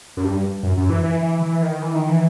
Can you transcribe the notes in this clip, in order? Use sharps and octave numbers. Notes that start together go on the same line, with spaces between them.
F#2
G2
F#2
F#2
E3
E3
E3
E3
D#3
E3
D#3
E3